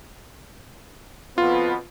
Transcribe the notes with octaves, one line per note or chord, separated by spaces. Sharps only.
F2 B2 B3 F4